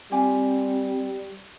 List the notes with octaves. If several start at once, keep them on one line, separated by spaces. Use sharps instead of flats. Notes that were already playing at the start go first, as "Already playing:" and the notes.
G3 C4 F4 G4 G#5